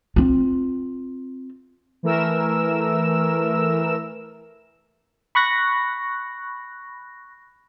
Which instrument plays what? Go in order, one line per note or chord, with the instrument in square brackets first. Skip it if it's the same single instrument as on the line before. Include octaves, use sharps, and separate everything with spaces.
[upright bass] C4 F4
[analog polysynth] E3 A3 A#4 E6 E7
[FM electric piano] B5 C#6 F#6 A#6